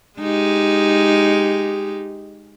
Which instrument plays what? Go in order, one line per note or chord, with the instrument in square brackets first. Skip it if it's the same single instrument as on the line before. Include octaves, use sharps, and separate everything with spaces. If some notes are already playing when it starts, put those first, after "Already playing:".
[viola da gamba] G#3 D#4 G4